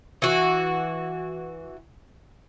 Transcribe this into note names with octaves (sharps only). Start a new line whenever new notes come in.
E3 F#4